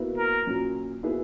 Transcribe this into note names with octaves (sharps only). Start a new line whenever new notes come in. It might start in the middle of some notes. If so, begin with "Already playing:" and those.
Already playing: B2 A#3 E4 B4
A#4
A#2 F#3 C#4
B2 A#3 E4 G#4 B4